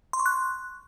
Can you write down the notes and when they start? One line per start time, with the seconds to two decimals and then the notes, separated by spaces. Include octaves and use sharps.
0.13 C6
0.19 C#6
0.26 F#6